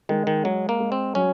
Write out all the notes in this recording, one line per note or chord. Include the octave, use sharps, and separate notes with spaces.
D#3 G#3
D#3
F#3 G#3
A#3
G#3
C4
F#3 C#4